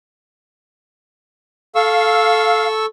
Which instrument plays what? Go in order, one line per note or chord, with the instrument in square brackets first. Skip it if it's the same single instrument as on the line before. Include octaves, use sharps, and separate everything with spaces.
[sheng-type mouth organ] A4 C#6 E6 [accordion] F5